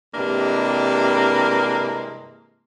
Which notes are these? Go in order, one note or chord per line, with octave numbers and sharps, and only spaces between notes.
G2 C3 E3 G#3 A#3 D4